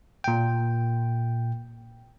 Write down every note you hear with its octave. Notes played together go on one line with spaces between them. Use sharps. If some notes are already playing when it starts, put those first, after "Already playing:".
A#2 G5